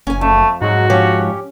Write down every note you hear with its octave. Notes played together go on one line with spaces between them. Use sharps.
F#1 C#4 G#5
F2 A3
G#2 F#3 G#3 D#4 F#4
F3 C#4 G4 C#5